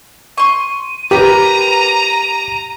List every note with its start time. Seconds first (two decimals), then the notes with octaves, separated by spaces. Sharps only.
0.37 C6 C#6 D#7
1.11 G4 A#4 B4 A#5